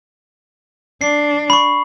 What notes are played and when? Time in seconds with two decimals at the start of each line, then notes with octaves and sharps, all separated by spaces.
1.01 D4 C7
1.50 B5 C#6